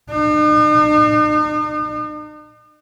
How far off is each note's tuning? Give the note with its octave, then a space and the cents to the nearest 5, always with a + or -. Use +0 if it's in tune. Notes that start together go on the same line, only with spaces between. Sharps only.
D#4 -45